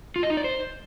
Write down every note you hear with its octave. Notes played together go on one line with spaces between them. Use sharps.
F4
D#5
D#4
D5
C5